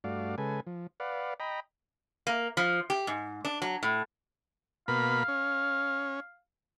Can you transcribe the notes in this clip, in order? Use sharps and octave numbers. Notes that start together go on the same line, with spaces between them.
G2 A3 F#4 D5 F5
C#3 G#3 A4 B4 G#5
F3
B4 D5 F5 F#5
D#5 G5 A#5 B5
A#3
F3
G4
G#2
D4
F#3
A2
B2 A#3 F5 B5
C#4